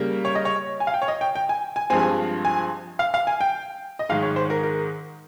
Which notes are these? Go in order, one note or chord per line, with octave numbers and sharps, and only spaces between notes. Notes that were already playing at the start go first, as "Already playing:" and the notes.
Already playing: C#3 G3 A#3
C#5
D#5
C#5
G#5
F5
G5
C#5
D#5
G5
G5
G#5
G#5
G2 F3 G#3 C4 G#5
G#5
F5
F5
G#5
G5
D#5
G#2 D#3 G#3 F5
C#5
C5
A#4
A#4